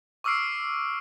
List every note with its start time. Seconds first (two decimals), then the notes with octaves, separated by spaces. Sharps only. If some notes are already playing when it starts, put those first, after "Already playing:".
0.24 C#6 D6 E6 F6 C7 D7